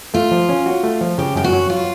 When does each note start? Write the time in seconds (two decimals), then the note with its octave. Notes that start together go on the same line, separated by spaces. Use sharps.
0.14 A3 F4
0.31 F3
0.49 C#4
0.66 F#4
0.83 A3
1.01 F3
1.18 C#3 G4
1.35 F#2 G4
1.44 F#4
1.53 F#3
1.70 F4